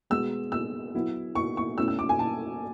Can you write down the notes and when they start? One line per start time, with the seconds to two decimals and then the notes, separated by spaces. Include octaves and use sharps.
0.10 B2 G#3 B3 E6
0.52 E6
0.94 F#3 B3 E4
1.35 C#6
1.57 C#6
1.78 B2 A3 C#4 E4 E6
1.88 E6
1.99 D6
2.09 G#5
2.19 A5